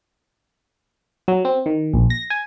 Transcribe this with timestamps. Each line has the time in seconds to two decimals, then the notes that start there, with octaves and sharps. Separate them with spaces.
1.28 F#3
1.45 C4
1.66 D#3
1.94 A#1
2.10 A#6
2.30 G#5